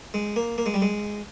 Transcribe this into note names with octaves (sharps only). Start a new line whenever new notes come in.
G#3
A#3
A#3
G#3
G3
G#3